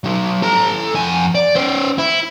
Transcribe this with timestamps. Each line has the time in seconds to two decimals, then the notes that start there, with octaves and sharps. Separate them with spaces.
0.04 F#3 D#4
0.42 A4 A#5
0.95 F2 G#5
1.35 D5
1.55 C#4 C5
1.98 E4